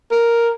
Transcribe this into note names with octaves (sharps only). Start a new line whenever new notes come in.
A#4